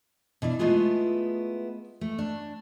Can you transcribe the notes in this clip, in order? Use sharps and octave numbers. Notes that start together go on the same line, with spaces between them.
B2 D4 E4
G#3 A3 B3 E4 F4 G#4
A3
D4